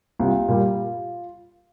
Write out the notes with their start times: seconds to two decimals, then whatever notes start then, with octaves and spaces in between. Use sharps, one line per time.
0.19 C2 F4
0.48 A#2 G3